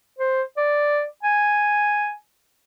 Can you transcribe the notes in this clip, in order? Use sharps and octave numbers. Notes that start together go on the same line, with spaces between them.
C5
D5
G#5